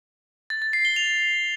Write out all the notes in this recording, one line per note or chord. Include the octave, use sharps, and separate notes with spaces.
A6
A6
C7
G7
F7